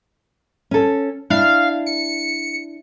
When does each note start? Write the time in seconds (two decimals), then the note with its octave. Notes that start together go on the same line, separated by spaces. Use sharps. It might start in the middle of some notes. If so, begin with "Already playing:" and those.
0.71 C#4 A4
1.30 D4 E4 F5
1.86 C#7